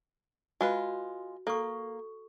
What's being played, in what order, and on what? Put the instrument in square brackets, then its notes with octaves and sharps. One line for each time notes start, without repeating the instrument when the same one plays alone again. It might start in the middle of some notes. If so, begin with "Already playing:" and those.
[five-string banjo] G#3 F4 B4 [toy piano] F#4
[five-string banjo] A#3 [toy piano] A4 C#6